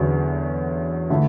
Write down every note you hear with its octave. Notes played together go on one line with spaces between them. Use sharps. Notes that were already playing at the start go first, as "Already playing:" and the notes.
Already playing: E2 D3 F#3 C#4 F#4
D3 A3 E4